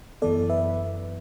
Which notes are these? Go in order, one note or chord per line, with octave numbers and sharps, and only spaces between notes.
F#2 E3 B3 A4 D5
B4 E5